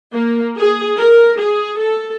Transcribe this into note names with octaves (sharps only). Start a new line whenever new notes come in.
A#3
G#4
A#4
G#4
A4